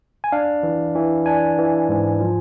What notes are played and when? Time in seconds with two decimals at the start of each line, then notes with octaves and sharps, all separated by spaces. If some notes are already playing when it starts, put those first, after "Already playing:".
0.24 G#5
0.32 D4 F5
0.63 E3
0.95 E3
1.26 D4 G#5
1.58 E3
1.89 G#2
2.20 F3